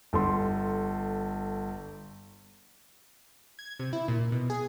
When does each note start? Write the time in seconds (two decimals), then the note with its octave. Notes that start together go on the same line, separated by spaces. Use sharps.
0.13 G1 A4 C6
3.59 G#6
3.80 C3
3.93 E4
4.08 A#2
4.32 B2
4.50 G#4